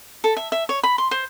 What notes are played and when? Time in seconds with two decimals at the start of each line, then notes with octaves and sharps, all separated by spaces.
0.24 A4
0.37 E5
0.52 E5
0.69 C#5
0.83 B5
0.98 C6
1.11 C5